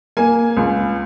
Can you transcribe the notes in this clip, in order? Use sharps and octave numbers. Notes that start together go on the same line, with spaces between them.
A#3 G#5
C#2